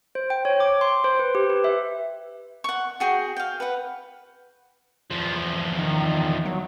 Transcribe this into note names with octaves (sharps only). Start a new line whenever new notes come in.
C5
G5
C#5
D6
C6
C5
B4
G4
B4
E5
F#5 C#6
F#4 G#4 G5
F5 G5
B4 F#5
E2 F3
D#3
F#3